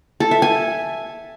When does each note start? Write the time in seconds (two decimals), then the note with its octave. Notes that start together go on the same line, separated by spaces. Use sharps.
0.20 A4
0.31 E5
0.42 G#5